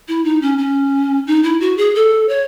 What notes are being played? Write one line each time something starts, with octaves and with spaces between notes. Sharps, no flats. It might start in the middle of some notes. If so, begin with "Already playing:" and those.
E4
D#4
C#4
C#4
D#4
E4
F#4
G#4
A4
C#5